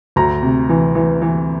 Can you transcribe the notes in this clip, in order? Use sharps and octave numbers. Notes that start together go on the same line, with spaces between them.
D2 A#5
C3
E3
E3
E3